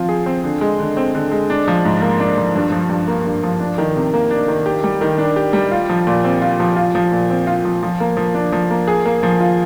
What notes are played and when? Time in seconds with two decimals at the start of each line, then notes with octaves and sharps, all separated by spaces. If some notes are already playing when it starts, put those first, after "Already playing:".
Already playing: F3 C4 F4
0.09 G#4
0.26 C4
0.44 D3
0.61 G#3
0.80 D3
0.97 C4
1.15 D3
1.32 G#3
1.50 D4
1.68 F3
1.85 G#2
2.02 A#3
2.20 D4
2.38 F3
2.55 G2
2.72 F3
2.90 G2
3.08 A#3
3.25 G2
3.43 F3
3.60 D4
3.78 D#3
3.96 C3
4.14 A#3
4.30 D4
4.48 D#3
4.66 G4
4.84 G3
5.01 D#3
5.18 D4
5.36 G4
5.53 G3
5.72 F4
5.89 F3
6.07 A#2
6.24 C4
6.42 F4
6.60 F3
6.76 F4
6.95 F3
7.12 A#2
7.30 C4
7.47 F4
7.65 F3
7.83 F3
8.00 A#3
8.17 F3
8.34 D4
8.52 F3
8.71 A#3
8.87 G#4
9.05 A#3
9.23 F3
9.40 F4